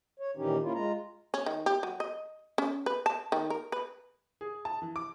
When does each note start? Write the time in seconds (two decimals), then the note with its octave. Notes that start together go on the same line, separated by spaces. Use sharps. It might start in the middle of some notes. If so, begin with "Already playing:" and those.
0.20 C#5
0.37 A#2 D#3 E3 C#4 D#4 G4
0.62 A#3 C#4 E4 F4
0.74 G#3 F4 A#5
1.34 C#4
1.46 D#3
1.66 G4
1.83 F#3
2.00 D#5
2.58 C#4
2.86 B4
3.06 A5
3.32 D#3
3.50 A#4
3.72 B4
4.41 G#4
4.65 A5
4.82 E3
4.96 D6